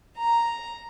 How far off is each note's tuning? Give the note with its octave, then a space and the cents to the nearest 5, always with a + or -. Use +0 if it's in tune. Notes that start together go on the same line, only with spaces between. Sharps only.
A#5 +0